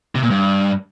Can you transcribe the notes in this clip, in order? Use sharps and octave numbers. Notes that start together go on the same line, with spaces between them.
C3
A#2
G2